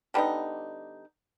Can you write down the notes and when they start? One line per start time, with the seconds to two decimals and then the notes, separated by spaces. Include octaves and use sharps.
0.14 D3 G3 B3 D#4